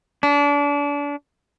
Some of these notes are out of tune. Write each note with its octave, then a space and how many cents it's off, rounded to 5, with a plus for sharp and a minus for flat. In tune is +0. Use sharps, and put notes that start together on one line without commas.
D4 -30